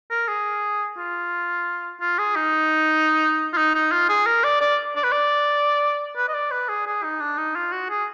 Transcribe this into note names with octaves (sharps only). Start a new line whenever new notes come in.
A#4
G#4
F4
F4
G#4
D#4
F4
D#4
D#4
F4
G#4
A#4
D5
D5
D5
B4
D5
B4
D#5
D5
B4
G#4
G#4
D#4
D4
D#4
F4
F#4
G#4